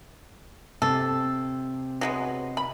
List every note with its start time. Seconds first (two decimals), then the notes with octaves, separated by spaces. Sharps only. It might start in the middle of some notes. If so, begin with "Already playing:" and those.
0.82 C3 A4
2.01 F#3 G#3 B3
2.57 B5